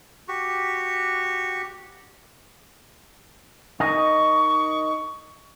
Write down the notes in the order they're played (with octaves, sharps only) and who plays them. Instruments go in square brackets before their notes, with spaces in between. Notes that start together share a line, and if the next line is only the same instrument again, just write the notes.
[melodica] F#4 G4 C#6
[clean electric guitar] D#4 A#4 D#5 [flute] C#6